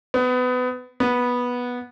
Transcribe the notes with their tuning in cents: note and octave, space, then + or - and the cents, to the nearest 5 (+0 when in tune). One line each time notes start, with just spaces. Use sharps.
B3 +25
B3 -10